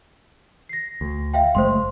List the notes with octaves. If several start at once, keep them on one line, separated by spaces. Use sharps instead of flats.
A#6 C7
D2
E5 F5 G5
F#1 G#3 A3 C5 C6